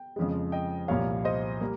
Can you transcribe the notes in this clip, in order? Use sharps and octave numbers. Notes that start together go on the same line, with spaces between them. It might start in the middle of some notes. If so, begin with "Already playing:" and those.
Already playing: G5
F2 C#3 F3 G#3
D#5 G5
C2 A#2 F3 C#5 F5
C5 D#5
G3 A#3